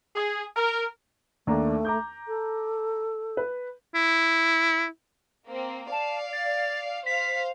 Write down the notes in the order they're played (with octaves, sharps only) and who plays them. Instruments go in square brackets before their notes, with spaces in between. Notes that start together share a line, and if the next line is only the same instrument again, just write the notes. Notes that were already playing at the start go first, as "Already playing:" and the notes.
[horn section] G#4
A#4
[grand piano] D#2 D4 A#5 [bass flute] A3
[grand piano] A#5 D6 G6
[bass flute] A4
[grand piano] B4
[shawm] E4
[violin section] A#3 C4
[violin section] D5 F5 [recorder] A5
[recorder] A6
[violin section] C5 F5 [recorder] B6